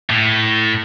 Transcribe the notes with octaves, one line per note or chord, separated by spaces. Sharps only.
A2